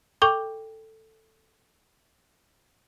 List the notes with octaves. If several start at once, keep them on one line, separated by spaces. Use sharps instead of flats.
A4 G5 C#6 D6